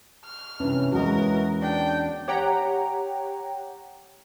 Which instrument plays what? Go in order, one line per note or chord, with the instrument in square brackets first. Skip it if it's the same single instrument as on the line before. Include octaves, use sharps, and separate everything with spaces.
[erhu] F6
[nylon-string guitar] C3 D4 [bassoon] E3 [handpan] C#4
[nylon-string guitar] E2 G#3 D#5 [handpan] F#4 [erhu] A#4
[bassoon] D4 [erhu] G5
[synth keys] G4 C#5 F#5 G5 A#5